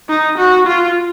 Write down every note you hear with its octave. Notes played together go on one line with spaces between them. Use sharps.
D#4
F#4
F4